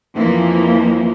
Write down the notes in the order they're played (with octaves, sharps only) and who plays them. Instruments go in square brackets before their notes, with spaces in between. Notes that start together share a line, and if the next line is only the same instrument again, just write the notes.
[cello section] F2 E3 F3 A#3